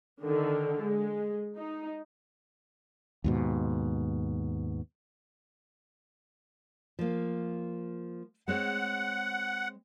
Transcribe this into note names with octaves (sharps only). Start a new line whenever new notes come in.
D3 D#3
G#3
D#4
D#2 G#2 B2
F3 A#3
G#3 C4 C#5 F#5